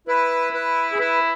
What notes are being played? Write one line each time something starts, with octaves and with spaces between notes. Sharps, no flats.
E4 B4
B4
G#4
E4 B4